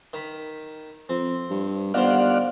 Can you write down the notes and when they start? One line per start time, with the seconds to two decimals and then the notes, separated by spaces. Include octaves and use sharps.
0.13 D#3 B5
1.09 F2 C4
1.50 G2
1.94 G1 D#3 G3 C5 D5 F5 F#5